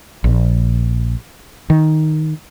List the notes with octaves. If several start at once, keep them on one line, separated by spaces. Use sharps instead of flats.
A#1
D#3